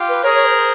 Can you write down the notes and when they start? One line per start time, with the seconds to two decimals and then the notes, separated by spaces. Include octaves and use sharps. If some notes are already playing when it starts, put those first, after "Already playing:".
Already playing: F4 G4
0.09 B4
0.23 G#4 A#4 C#5
0.34 C#5
0.45 C5
0.55 C5